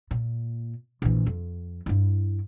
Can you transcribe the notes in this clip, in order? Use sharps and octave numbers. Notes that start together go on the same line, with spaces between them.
A#2
A#1 E3
F2
G2 E4